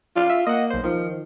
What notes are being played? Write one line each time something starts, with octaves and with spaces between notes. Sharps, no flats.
F4 D5 F5
E5
A#3 D#5 F#5
B1 C5
D#3 F3